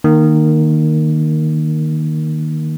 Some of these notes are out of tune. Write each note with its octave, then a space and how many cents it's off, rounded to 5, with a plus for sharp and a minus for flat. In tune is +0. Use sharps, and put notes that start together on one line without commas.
D#3 -10 A#3 +0